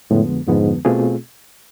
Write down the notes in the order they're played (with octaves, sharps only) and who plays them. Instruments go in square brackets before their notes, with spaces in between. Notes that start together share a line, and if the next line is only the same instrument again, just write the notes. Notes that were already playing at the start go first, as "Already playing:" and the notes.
[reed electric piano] F2 D3 F3 G#3 B3 [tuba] A2
[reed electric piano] F2 D3 F3 G#3 B3 [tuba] G#2
[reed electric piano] B2 A3 C4 F4 G#4